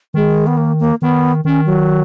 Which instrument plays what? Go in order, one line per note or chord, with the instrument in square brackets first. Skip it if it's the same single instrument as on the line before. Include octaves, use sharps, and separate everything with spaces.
[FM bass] D#3 [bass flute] G#3
[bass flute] B3
A#3
A#3
[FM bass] D#3 [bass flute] B3
[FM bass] D#3 [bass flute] C#4
[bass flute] F#3